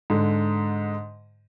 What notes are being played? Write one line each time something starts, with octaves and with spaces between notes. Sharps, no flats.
G#2 D3